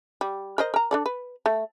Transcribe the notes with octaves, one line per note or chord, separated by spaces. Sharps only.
G3
A#4 C5 D#5
A#4 A#5
D4 A4 D5
B4
A3